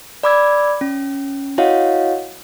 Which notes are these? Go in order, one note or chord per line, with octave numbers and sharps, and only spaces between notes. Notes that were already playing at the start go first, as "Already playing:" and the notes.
D5 B5 D6 E6 G#6
C#4
E4 F#4 C#5 D#5 F5 F#5